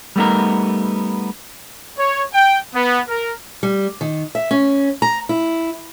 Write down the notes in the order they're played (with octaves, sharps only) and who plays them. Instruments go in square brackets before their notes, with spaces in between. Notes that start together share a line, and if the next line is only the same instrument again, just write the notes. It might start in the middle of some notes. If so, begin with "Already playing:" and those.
[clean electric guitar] G3 A3 B3 D#4 A#4
[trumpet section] C#5
G5
B3
A#4
[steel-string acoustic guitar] G3
D#3
E5
C#4
A#5
E4